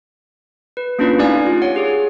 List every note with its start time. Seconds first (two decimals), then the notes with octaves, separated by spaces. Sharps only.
0.77 B4
0.99 A#3 C#4 D4 E4 F4 B4
1.18 A3 D#4 G4 D5 F5 G#5
1.46 F4
1.62 C#5 F#5
1.76 G4 G#4 C#5